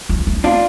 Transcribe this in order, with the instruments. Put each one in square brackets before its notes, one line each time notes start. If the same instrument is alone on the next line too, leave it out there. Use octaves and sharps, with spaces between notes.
[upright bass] F3
A3
[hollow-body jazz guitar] D4 F4